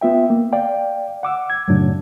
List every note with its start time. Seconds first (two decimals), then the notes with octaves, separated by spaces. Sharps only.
0.01 B3 F4 E5 G5
0.30 A#3
0.53 D5 F5 G5
1.23 F#5 D6 E6
1.50 G#6
1.68 F#2 A2 C#3 F#3 D4